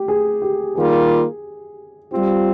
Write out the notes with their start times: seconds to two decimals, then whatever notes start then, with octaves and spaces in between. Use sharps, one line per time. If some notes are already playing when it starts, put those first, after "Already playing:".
Already playing: G4
0.08 G#4
0.42 G4
0.75 D#3 G3 A#3 F4 G#4
2.11 G3 C4 F4 G4